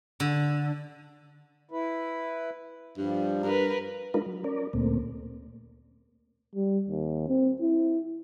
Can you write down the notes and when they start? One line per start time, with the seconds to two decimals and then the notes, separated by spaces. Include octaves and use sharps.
0.20 D3
1.71 E4 B4
2.97 G2 F3 G3
3.43 G2 A#4 B4
4.14 G#3 D4 D#4 F4 A#4 B4
4.26 F#3
4.44 C#4 A#4 D5
4.73 D2 A#2 A3 A#3 C4
6.55 G3
6.89 D#2
7.28 C4
7.61 E4